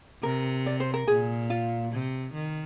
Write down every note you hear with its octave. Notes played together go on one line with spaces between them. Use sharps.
C3 A#4
D5
C5
A#4
A#2 G#4
F4
C3
D#3